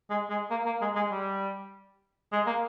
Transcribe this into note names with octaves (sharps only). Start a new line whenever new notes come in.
G#3
G#3
A#3
A#3
G#3
G#3
G3
G#3
A#3